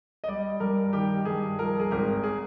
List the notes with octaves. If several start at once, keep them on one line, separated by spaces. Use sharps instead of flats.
D#5
G3 D5
G2 A#4
D#3 G4
G2 G#4
F3 A#4
G#4
G#1 A#4
G#4